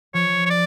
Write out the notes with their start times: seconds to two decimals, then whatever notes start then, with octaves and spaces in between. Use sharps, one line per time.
0.14 F3 C#5
0.45 C#5
0.50 D5